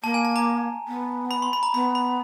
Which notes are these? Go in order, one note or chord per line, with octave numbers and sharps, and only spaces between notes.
A#3 A5
G#5
A5
A#5
B3
B5
C6
B5
A#5
B3 B5
B5